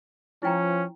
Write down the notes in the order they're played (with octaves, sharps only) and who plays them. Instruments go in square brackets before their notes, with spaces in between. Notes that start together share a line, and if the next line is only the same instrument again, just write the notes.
[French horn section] F3 [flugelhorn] C#4 [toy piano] E4 G5 A#5